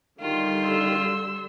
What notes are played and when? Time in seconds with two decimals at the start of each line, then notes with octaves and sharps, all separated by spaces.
0.20 D3 D#3 G3 F4 C6
0.66 E6